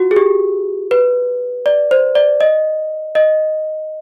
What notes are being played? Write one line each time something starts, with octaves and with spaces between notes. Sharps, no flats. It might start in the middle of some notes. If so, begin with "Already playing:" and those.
Already playing: F4 F#4
G#4
G4
B4
D5
C5
D5
D#5
D#5